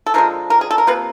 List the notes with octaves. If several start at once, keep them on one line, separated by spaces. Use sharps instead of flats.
A4
D3 F3 G#3 A#4
A#4
G#4
A4
A#4
C3 F3 A#3 B4